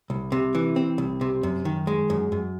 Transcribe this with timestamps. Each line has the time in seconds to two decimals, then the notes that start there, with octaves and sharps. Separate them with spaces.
0.10 C2
0.32 C3
0.55 E3
0.76 C4
0.98 C2
1.21 C3
1.43 F#2
1.65 D#3
1.87 G#3
2.10 F#2
2.32 F#2